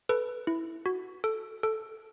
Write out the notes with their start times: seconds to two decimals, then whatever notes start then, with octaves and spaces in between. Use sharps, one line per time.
0.09 A4 B4
0.47 E4
0.86 F#4
1.24 A4
1.63 A4